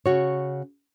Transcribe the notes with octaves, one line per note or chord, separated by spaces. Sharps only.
C#3 F#4 C#5